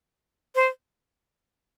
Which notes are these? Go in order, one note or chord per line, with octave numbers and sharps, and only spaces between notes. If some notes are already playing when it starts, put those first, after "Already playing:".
C5